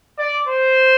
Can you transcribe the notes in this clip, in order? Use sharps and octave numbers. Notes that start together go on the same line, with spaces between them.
D5
C5